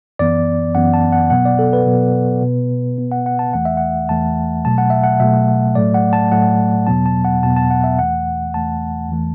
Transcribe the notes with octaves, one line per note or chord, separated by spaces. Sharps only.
F#2 E3 B3 D5
F#2 E3 B3 F#5
A5
F#5
B2 F#3 B3 F#5
D5
A4
B4
B2 F#3 B3
B2 B3
B2 B3
F#5
F#5
A5
E2 E3 A3 F#5
E5
F#5
E2 E3 A3 A5
B2 F#3 A3 A5
F#5
E5
F#5
B2 F#3 A3 E5
A2 F#3 A3 D5
F#5
A5
A2 F#3 A3 F#5
E2 B2 F#3 B3 A5
A5
F#5
E2 B2 F#3 B3 A5
A5
F#5
E5
E2 E3 A3 F#5
E2 E3 A3 A5
E2 E3 A3